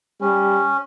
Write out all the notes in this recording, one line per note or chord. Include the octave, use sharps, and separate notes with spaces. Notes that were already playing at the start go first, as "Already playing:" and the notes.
G3 C#4